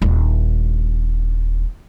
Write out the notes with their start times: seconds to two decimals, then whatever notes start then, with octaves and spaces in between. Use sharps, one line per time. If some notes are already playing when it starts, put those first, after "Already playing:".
0.02 D#1 D4